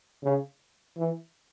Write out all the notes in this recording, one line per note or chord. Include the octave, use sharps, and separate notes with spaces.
C#3
E3